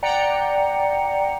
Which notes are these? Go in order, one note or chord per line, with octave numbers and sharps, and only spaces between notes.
D5 F#5 G5 A#5 C#7